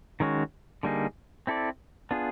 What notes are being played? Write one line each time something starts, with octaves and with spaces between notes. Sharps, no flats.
D#3 G#3 C#4 F#4
D3 G3 A#3 D#4 G#4
C4 E4 A4 D5
B3 D4 F4 G#4